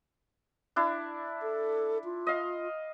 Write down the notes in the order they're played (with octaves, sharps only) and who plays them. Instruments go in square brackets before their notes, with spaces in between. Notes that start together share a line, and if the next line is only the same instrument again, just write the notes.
[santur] D4 E4
[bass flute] A4
F4
[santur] D#5 F5